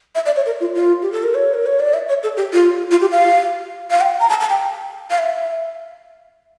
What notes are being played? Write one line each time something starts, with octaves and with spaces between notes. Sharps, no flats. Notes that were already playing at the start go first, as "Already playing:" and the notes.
E5
D5
C#5
A#4
F4
F4
G4
A4
A#4
C#5
A#4
C#5
D5
E5
C#5
A4
G4
F4
F4
G4
F5
F5
G5
A#5
A5
A5
G5
F5
E5